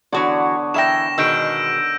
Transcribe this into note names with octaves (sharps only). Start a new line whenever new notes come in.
D3 E3 B3 F#4 C#5 D5
E3 A#4 E5 G5 A#6 E7
B2 D#3 G#3 E6 G6 D7